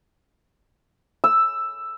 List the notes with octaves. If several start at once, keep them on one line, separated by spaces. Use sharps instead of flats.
E6